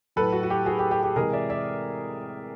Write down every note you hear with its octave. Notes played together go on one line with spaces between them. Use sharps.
A2 F#3 A4 B4
F#4
F#4
G4
F#4 G#4
G4
G4
G4
C3 E3 G#3 G#4 A#4
D5 E5
D5 E5